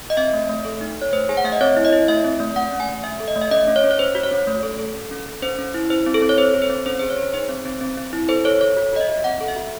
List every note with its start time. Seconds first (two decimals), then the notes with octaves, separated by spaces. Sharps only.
0.10 D#5
0.17 C4 E5
0.33 A3
0.49 A3
0.65 A4
0.81 D#4
0.97 D#4 C#5
1.13 A3 C5
1.29 G#4 G#5
1.37 F#5
1.44 A3 E5
1.52 D#5
1.61 C4 C#5
1.77 E4
1.85 D#5
1.93 E4
2.08 A3 E5
2.24 C4
2.40 A3
2.56 A3 F#5
2.72 C#4
2.80 G#5
2.88 A3
3.04 A3 E5
3.20 A4
3.28 D#5
3.36 A3
3.41 E5
3.51 C#4 D#5
3.68 C#4
3.76 C#5
3.84 C#4
3.91 C#5
3.99 C#4 C5
4.15 F#4
4.23 C#5
4.32 C#4
4.47 A3
4.63 A4
4.79 A4
4.95 C#4
5.11 C#4
5.26 A4
5.42 C#4 C5
5.58 C#4
5.74 E4
5.90 E4 C5
6.06 C4
6.14 A4
6.22 C4
6.29 C#5
6.38 C4 C5
6.54 A4
6.62 C5
6.70 C4
6.86 C#4 C5
6.99 G#4 C5
7.10 C#5
7.17 G#4
7.34 D#4 C5
7.49 C4
7.65 C4
7.81 C4
7.97 C4
8.13 E4
8.29 A4 C5
8.45 A4 C#5
8.61 A4 C#5
8.77 F#4
8.93 F#4 D#5
9.00 E5
9.09 F#4
9.24 C4 F#5
9.40 A4
9.48 E5
9.56 F#4